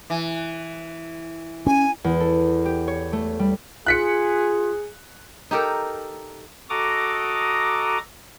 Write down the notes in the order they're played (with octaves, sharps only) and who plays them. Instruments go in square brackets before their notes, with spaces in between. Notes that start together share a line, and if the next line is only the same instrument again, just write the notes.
[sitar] E3
[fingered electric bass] C#4 [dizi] G#5
[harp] E2
A4
G4
C#5
A3
G3
[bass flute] F4 [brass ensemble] G#4 [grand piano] F#6 B6 C#7
[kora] D#4 G4 A4 A#4
[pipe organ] F#4 A4 D#5 A#5 D6 D#6